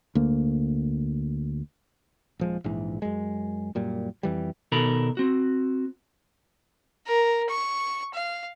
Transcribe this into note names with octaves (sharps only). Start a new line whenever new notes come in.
D2 A#3
D#1 F3 G#3
A#1 G#2 E3
F#2 G#3
F#2 A#2 G3
F2 E3 G3
B2 D#3 A4 A#4 A#5 B5
C4 F#4
A#4
C#6
F5